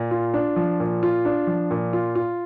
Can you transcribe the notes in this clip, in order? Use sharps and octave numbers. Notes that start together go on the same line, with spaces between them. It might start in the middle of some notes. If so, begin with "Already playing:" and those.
Already playing: A#2
F4
D4
F3
A#2
F4
D4
F3
A#2
F4
F4